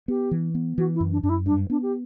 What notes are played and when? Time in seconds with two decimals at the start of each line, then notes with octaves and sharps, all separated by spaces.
0.08 B3 G4
0.31 E3
0.55 B3
0.78 E3 F#4
0.94 E4
1.00 F#2
1.12 D4
1.22 F#2 D4
1.29 E4
1.46 G2 D4
1.70 B3 D4
1.82 G4